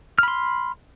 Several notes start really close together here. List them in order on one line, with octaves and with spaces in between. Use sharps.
F6 B5 C6